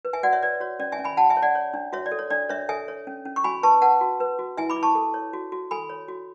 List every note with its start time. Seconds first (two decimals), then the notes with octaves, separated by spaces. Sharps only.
0.05 B4
0.13 E5 G#5
0.23 F#4 D5 F#5
0.33 C#5 E5
0.43 B4 D5
0.60 F#4 C#5
0.80 C#4 D5
0.92 E5 G#5
0.99 C#4
1.04 G#5 B5
1.17 F#4 F#5 A5
1.30 E5 G#5
1.37 C#5
1.43 D5 F#5
1.55 C#5
1.74 D4
1.93 F#4 C#5 E5
2.06 D5
2.12 A4
2.19 C#5
2.30 D4 D5
2.49 D4 C#5 E5
2.69 A4 E5 G#5
2.88 C#5
3.07 C#4
3.25 C#4
3.36 C#6
3.44 F#4 G#5 B5
3.63 B4 A5 C#6
3.82 B4 F#5 A5
4.01 F#4
4.20 B4
4.39 F#4
4.57 E4 E5 G#5
4.70 B5 D6
4.76 E4
4.83 A5 C#6
4.95 A4
5.14 C#5
5.33 F#4
5.52 F#4
5.71 A4 G#5 B5
5.90 C#5
6.08 F#4